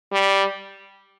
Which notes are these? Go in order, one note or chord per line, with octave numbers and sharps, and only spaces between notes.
G3